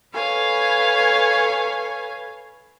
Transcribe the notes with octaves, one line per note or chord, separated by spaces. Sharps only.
A4 B4 C#5 F5 G#5